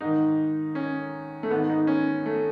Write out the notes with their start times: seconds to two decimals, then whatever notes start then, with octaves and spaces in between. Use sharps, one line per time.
0.01 G#2 D#3 D#4
0.75 C#4
1.43 A3
1.51 G#2 B3
1.54 D#3
1.69 D#4
1.87 C#4
2.26 A3